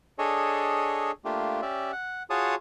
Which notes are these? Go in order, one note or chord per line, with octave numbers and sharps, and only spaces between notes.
D4 G#4 A4 C#5 D#5
A3 A#3 D4 F4 G4
C#4 G4 D5 E5
F#5
F4 F#4 G#4 C#5 A5 D#6